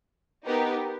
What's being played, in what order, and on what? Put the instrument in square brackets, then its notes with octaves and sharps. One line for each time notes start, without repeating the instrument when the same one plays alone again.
[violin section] B3 D#4 G4 A#4